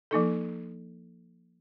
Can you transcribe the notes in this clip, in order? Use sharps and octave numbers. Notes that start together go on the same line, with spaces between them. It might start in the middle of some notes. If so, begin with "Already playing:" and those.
F3 A#3 D#4 A4